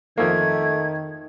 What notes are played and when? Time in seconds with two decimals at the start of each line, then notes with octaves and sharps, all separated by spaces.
0.18 F2 D#3 A3 A#3 G#6